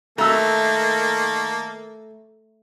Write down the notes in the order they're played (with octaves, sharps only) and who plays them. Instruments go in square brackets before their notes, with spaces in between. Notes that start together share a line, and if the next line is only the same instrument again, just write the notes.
[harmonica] D#3 A#3 A4 [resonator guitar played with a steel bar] A3 [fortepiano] A#5 E6